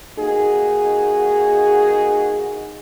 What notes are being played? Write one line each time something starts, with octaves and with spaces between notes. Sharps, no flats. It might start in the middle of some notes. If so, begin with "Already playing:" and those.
A#3 D#4 F#4 G#4